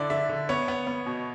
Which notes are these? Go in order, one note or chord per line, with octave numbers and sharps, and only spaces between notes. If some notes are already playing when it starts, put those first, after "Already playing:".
Already playing: D3 E4 D5
D3 E5
D3
B3 C#5
B3
B3
B2